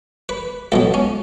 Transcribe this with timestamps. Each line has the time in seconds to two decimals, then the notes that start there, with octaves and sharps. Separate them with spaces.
0.29 B4
0.72 C#2 B2 F#3 A4
0.94 C#4